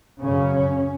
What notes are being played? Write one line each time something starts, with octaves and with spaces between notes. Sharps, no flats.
F#2 C#3 C#4